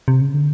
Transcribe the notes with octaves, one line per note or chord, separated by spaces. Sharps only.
C3
C#3
D3